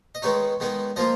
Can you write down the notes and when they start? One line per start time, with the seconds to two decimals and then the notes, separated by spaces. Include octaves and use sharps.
0.15 D#5
0.22 D#3 G#3 B3 D#4 C#5
0.60 D#3 G#3 B3 D#4
0.96 F3 A#3 F4 D#5